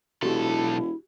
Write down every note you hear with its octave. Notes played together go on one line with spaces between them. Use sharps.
E1 B1 E4 F#4 G4 A4